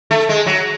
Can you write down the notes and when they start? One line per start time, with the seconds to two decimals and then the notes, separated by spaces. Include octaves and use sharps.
0.11 A3
0.29 G#3
0.46 F#3